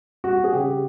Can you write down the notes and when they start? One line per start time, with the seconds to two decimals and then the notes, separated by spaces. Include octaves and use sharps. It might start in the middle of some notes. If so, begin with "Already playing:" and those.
0.24 G3 F#4
0.44 G#4
0.53 C#3 G4